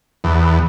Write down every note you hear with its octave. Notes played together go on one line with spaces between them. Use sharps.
E2